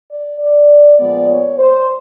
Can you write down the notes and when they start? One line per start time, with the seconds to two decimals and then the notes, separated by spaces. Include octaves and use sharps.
0.10 D5
0.39 D5
0.99 A#2 F3 G#3 B3 D5
1.29 C#5
1.58 C5